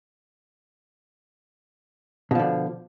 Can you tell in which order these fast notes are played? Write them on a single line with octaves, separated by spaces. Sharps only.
B2 F3 D3